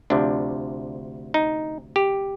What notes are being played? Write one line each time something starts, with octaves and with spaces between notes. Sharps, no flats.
D2 C3 F3 D4
D#4
G4